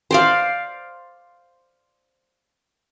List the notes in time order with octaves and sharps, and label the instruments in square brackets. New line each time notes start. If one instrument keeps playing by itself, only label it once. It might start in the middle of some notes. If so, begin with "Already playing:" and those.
[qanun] C5 D5 F5